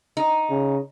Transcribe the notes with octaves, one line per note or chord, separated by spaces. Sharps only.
D#4
C#3